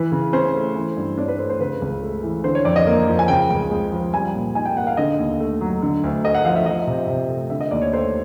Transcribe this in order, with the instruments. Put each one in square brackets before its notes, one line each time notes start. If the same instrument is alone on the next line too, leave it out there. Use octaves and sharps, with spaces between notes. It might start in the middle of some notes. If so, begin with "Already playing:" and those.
Already playing: [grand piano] E3 B4
C#3
C#4 C5
A3
E3
G2
D4 C#5
B4
A3 C5
C5
C#3 B4
C#2
A3
E3
D3 C5
C#5
F2 D5
D#5
A#3
F3
G#5
C#3 G5
C#2
G#3
F3
G3 G#5
A#2
D#4 G#5
G5
A#3 F#5
F5
D3 D#5
D#2
A3
F#3
D3
D2
A3 D#5
F#5
F3 F5
E5
F3 D#5
C3
C3
A3
D3 E5
D#5
D#2 D5
C#5
A3 C5